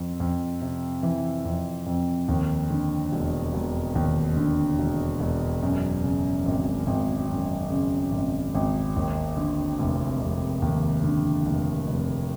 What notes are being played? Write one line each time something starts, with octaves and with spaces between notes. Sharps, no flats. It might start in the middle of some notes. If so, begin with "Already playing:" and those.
Already playing: F2
F2
C3
E3
F2
F2
D#2
D3
E1
E1
D#2
D3
E1
E1
F#2
C#3
G#1
G#1
F#2
C#3
G#1
G#1
D#2
D3
F1
F1
D#2
D3
F1
F1